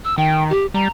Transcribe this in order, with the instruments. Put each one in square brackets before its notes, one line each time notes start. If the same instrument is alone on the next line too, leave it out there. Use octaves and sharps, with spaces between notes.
[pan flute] E6
[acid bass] D#3 [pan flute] G5
[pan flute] G4
[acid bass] G3 [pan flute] A#5